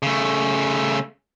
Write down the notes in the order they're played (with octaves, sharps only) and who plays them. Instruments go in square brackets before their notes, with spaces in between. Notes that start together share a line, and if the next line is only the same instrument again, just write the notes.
[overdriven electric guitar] C#3 A3